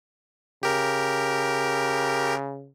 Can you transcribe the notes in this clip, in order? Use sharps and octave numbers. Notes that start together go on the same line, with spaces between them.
C#3 G4 A#4